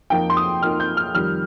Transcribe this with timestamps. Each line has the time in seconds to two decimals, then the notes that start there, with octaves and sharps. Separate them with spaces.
0.10 F2 F3 A#3 D#4 G5
0.30 C6
0.37 D#6
0.62 F2 F3 A#3 D#4 F6
0.80 G6
0.97 F6
1.14 F2 D#3 G3 F6